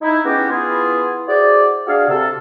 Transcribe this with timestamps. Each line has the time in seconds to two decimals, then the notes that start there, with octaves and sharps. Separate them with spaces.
0.02 D#4 E4
0.25 G#3 B3 C#4 E4 F#4 G4
0.50 B3 E4 F4 G#4
1.28 E4 F#4 G#4 C5 D5
1.87 D4 F#4 G#4 D5 E5 F5
2.09 C3 A4